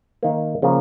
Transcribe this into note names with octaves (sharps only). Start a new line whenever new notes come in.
D#3 A#3
C#3 F3 A#3